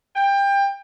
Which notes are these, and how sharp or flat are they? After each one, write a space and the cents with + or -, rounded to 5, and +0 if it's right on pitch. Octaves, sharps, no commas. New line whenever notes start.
G5 +25